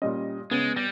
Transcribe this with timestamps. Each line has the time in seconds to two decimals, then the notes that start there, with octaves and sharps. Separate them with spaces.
0.02 A#2 G3 C#4 D#5
0.51 C#3 G#3 B3 A6
0.76 G3 A#6